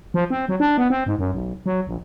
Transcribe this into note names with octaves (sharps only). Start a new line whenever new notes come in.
F3
C4
F#3
D4
B3
C4
G#2
F#2
B1
F#3
A#1